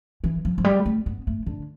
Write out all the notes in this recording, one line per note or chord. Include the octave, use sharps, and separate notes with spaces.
E3
F3
F3
G3
A3
B3
A3
D3